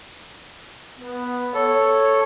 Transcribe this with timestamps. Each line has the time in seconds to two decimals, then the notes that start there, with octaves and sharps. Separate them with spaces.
0.99 B3
1.54 A4 C#5